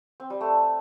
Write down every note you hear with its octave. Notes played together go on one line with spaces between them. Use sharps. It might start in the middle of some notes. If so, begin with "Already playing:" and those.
C4
G3
A3